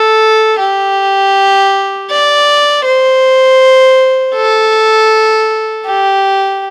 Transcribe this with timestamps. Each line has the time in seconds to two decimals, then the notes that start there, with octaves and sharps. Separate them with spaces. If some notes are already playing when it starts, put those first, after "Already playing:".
Already playing: A4
0.59 G4
2.10 D5
2.84 C5
4.35 A4
5.86 G4